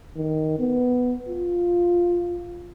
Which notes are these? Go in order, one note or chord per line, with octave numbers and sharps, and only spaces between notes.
D#3
B3
F4